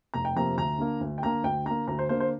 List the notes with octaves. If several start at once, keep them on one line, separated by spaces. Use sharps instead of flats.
F1 A#5
G5
F2 C3 F3 A#3 A#5
D2 A#5
D3 A#3
D2
G5
D3 A#3 A#5
D2 G5
D3 A#3 A#5
D2 A#5
C5
D3 A#3 C5
C5